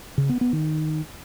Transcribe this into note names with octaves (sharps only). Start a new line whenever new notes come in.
C#3
B3
B3
D#3